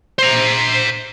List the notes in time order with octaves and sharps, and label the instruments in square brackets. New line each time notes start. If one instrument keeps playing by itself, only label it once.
[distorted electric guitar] C5 A#5